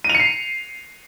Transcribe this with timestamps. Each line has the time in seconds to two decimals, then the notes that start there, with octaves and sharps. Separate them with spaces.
0.04 D#7
0.10 F7
0.15 C#7
0.20 C7